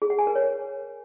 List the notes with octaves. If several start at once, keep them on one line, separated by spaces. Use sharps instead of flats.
G#4
F#5
G#5
A#4
C#5